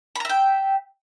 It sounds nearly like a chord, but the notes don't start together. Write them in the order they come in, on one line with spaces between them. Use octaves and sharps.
B5 A#5 E5 G5